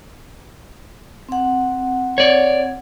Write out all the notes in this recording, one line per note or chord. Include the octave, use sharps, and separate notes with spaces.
C4 F#5
C#5 D5